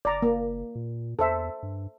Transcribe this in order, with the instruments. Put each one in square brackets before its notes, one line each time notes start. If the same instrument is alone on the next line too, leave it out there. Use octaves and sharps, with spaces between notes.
[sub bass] F#1 [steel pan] D5 A#5
[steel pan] A#3
[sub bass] A#2
[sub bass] E2 [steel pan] A4 C5 E5
[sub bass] G2